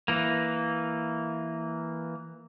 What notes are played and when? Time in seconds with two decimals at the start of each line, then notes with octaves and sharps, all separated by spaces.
0.08 E3 A#3